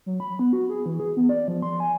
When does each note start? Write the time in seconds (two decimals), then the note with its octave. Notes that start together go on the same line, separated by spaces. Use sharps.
0.06 F#3
0.20 B5
0.39 B3
0.53 F#4
0.70 G#4
0.86 E3
1.00 G#4
1.17 B3
1.29 D5
1.48 F3
1.62 C6
1.80 G#5